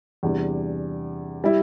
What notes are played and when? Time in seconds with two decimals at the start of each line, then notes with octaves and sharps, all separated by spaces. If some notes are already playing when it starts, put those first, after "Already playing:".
0.23 E2 C3 G3 D4
1.44 G3 E4